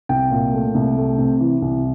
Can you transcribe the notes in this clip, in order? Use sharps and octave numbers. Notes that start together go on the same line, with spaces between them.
C2 G5
A#2
A3
C2
A3
C3
E3
C2